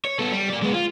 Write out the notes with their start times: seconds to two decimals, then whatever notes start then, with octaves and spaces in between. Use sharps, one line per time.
0.04 C#5
0.19 B3 A4
0.32 G3
0.50 A#3 D5
0.63 G#3 B3
0.74 F4